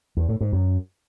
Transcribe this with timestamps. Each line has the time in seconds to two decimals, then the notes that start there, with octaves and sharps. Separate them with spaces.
0.17 E2
0.29 A2
0.41 G#2
0.53 F#2